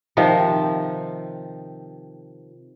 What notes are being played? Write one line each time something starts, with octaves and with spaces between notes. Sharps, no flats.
C3 D#3 F3